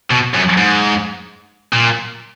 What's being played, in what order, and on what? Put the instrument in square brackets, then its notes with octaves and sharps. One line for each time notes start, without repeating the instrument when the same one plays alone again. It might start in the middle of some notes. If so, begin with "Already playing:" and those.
[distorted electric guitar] B2
F#2
G#2
A#2